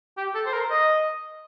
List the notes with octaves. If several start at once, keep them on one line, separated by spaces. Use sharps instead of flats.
G4
A4
C5
A#4
D#5